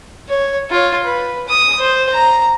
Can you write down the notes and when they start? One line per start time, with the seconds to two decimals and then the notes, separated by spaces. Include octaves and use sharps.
0.28 C#5
0.70 F4 C#5
1.03 B4
1.48 D#6
1.79 C5
2.13 A#5